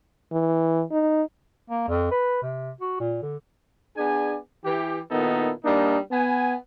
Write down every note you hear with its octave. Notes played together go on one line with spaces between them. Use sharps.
E3
D#4
A#3
F2
B4
C3
F#4
A#2
D3
B3 D4 G#4 D5 G#5
E3 G4
A#2 D#3 B3 D#4 E4 A4
G3 A#3 D4 D#4
B3 G#5